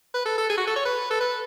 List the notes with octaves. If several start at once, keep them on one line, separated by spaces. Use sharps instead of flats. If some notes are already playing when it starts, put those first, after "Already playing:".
B4
A4
A4
G#4
F#4
A4
C#5
B4
A4
B4